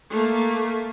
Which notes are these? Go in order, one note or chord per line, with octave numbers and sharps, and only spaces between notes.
A3 A#3